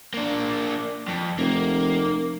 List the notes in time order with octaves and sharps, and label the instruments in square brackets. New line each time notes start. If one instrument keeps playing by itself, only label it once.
[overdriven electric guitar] A#3 D4
F2
[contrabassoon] F1 [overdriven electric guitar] A#3